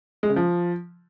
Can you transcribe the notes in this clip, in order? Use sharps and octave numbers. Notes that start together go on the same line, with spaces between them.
G#3
C#3
F3